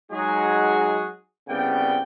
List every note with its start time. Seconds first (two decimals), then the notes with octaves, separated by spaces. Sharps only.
0.12 F#3 G#3 D#4 F#4 G#4
1.49 C2 C#3 B3 D5 G5